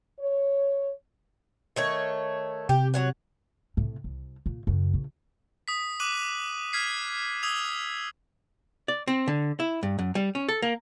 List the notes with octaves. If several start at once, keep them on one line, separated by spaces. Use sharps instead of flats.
C#5
D#3 A3 C#5
C3 G4
F#3 C#5 F#5
A2 C3
C2
A#2
F#2 C#3
A#1
D#6 B6
D6 F#6 D#7 F#7
F6 G#6 B6 C7
D#6 E6 G#6 F7
D5
C4
D3
E4
G2
F#2
G3
C#4
A4
A#3